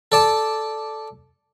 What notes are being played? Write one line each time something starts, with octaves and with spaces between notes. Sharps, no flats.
A4 D5 A5